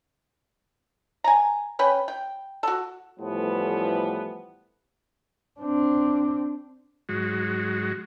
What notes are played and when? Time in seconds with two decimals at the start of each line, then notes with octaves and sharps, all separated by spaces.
1.24 G#5 A#5
1.79 C#4 B4 G5
2.08 G5
2.63 F#4 A4
3.20 A2 E3 F3 G3 A3 B3
5.60 C4 D4
7.09 G#2 F#3 G#3 F#4